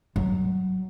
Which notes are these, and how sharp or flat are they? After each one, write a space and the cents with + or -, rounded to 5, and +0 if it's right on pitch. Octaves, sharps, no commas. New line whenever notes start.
F#3 +10